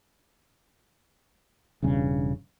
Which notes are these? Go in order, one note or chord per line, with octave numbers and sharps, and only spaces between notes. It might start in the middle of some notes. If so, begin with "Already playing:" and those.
E1 G2 C#3